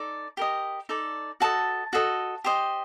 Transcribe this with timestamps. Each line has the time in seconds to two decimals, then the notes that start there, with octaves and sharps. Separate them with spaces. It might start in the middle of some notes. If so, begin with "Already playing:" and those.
Already playing: D#4 A4 D5
0.37 G4 A#4 D#5
0.89 D#4 A4 D5
1.40 F#4 A4 D#5 A5
1.93 F#4 A4 D#5
2.44 G4 C5 D#5